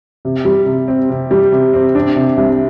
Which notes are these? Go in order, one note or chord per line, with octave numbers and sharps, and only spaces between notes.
C3
G3
C3
C4
C3
G3
C3
C4
D4
C3
C2